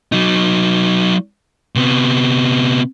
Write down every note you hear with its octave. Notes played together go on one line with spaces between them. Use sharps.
F#3 D#4
C3 B3